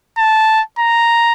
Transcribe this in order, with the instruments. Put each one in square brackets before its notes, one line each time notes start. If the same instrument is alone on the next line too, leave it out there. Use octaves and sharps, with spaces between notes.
[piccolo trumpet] A5
A#5